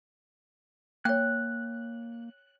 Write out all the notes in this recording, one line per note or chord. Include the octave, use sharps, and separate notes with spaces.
A#3 C#5 G5 F#6